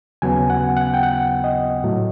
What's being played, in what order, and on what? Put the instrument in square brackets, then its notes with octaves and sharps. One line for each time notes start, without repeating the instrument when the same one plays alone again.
[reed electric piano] D#2 C#3 F#3 B3 G#5
F#5
F#5
G5
F#5
D#5
A2 F#3 A3